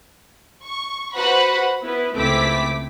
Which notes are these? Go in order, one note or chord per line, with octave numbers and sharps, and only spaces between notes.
C#6
F#4 B4 C5 F#5 B5
B3 E4 B4
C#2 A3 C4 E4 D6 B6